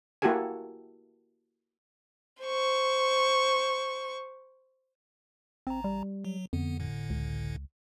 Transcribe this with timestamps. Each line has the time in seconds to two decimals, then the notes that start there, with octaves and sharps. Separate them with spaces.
0.22 A#3 E4 F#4 G4 A4 G#5
2.43 C5 C#6
5.67 A1 C4 A#5
5.84 G3
6.25 F#3
6.53 F2 D3 B3
6.79 G1 A2 D3
7.10 C#2